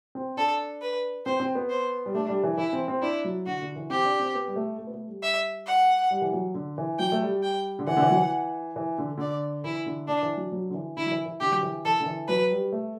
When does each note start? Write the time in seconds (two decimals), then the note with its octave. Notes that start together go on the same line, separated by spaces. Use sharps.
0.15 C4
0.37 D4 A4
0.82 B4
1.26 C4 C5
1.40 C4
1.55 B3
1.70 C5
2.06 G3
2.15 A3 D4
2.29 G3
2.43 E3
2.58 E3 E4
2.73 C4
2.88 C4
3.02 D4 E4
3.25 F#3
3.46 D3 F#4
3.62 D3
3.76 E3
3.90 C4 G4
4.05 D4
4.19 C4
4.35 B3
4.48 G3
4.56 A3
4.79 A3
4.87 B3
4.94 A3
5.08 G3
5.23 E5
5.67 F#5
6.11 G3
6.22 E3
6.33 F#3
6.55 D3
6.78 E3
6.99 F#3 G5
7.12 A3
7.22 G3
7.43 G5
7.79 D3
7.87 E3 F#5
7.97 D3
8.02 E3
8.10 F#3
8.16 E3
8.76 E3
8.98 D3
9.17 D3 D5
9.64 E3 E4
9.86 D3
10.07 D3 D4
10.23 E3
10.37 F#3
10.52 F#3
10.70 D3
10.74 E3
10.96 D3 E4
11.06 F#3
11.12 E3
11.26 E3
11.40 D3 G4
11.52 F#3
11.63 E3
11.85 E3 A4
12.00 D3
12.06 E3
12.28 F#3 B4
12.51 G3
12.72 A3